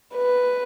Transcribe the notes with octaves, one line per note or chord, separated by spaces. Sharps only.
B4